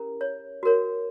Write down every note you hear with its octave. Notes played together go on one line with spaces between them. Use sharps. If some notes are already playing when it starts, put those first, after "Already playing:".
Already playing: C#4 E4 G4 A#4
C#5
F#4 A#4 C#5